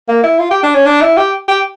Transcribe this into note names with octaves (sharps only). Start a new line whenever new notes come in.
A#3
E4
F4
G4
D4
C#4
D4
E4
G4
G4